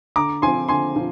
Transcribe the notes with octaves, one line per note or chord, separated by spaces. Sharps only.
D3 A#5 D6
F3 C4 G#5 C6
D3 G#5 C6
F3